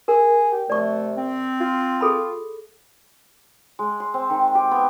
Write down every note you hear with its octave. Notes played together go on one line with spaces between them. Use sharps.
G#4 A#4
G4
C3 A3 D5 C#6
C4
F4
G#4 A4 B5
G#3
C6
C4
D#3
G4
B3